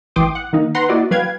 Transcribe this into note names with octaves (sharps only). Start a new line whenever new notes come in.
A1 E3 G5 C6 D6 D#6
F#5
D#3 A#3 D#4
B4 F#5 A#5 C6
A#3 E4 F#4 D5 D#5 F#5
F#3 B4 F5 G5 G#6